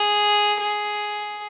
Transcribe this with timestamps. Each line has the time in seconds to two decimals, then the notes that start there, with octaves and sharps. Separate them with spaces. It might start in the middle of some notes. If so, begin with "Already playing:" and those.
Already playing: G#4
0.60 G#4